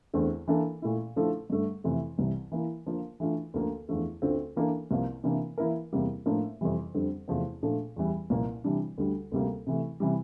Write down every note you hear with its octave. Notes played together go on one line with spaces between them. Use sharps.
E2 D3 A3 C4
E3 A#3 D4 A4
A#2 A3 E4
D3 F3 A3 E4 A4
G2 D3 A3
F2 C3 E3 A3
C2 C3 E3 G3
E3 A#3 E4
D3 F3 A#3 F4
E3 A3 D4 F4
D2 D3 F3 A#3
E2 D3 F3 A3
D2 D3 A3 C4 F4
E3 A#3 D4 A4
C2 C3 F3 A#3
C3 E3 A#3 D4
E3 A#3 E4 A#4
E2 C3 G3 A#3
A2 F3 A#3 D4
F2 C3 E3 G3
F2 D3 G3 C4
E2 C3 F3 A3 C4
A#2 F3 A3 D4 A4
E2 E3 G3
C2 A#2 F3 A#3
C3 E3 G3 D4
D2 D3 G3
D2 C3 G3 A#3
C3 E3 A3
C3 E3 G3